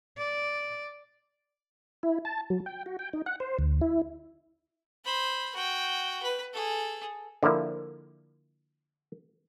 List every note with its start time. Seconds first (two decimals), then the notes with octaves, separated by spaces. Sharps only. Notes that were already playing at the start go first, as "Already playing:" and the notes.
0.18 D5
2.03 E4
2.25 A5
2.50 F#3
2.66 G5
2.86 F#4
2.99 G5
3.13 D#4
3.26 F#5
3.40 C5
3.59 D2
3.81 E4
5.04 C5 B5
5.55 F#4 G5
6.22 B4
6.53 G#4 A4
7.43 D3 F3 A#3 E4 C5